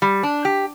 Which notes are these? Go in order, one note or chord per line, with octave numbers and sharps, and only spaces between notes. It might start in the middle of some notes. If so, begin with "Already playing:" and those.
G3
D4
G4